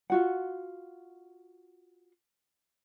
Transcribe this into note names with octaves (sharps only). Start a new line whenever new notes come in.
F4 F#4 F#5